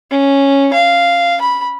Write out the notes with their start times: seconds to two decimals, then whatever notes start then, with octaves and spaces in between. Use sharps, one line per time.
0.11 C#4
0.73 F5
1.41 B5